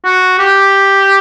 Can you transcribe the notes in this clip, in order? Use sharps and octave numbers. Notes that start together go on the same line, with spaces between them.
F#4
G4